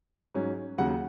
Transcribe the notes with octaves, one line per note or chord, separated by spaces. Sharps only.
G#2 F#3 C#4
D#2 C#3 F#3 F#5